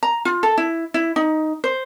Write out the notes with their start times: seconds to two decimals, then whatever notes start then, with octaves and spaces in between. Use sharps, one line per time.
0.03 A#5
0.25 F4
0.43 A4
0.58 E4
0.94 E4
1.16 D#4
1.64 C5